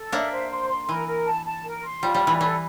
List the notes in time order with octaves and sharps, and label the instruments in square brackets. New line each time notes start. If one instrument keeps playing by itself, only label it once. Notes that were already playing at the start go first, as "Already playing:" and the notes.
Already playing: [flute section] A4
[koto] A#3 D4 [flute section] E5
[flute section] C5
C6
C6
[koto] E3 [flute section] A#4
[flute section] A#4
A5
A5
A#4
C6
[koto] G3 [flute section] F4
[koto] G3
[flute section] D5
[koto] E3
[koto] E3 [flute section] A4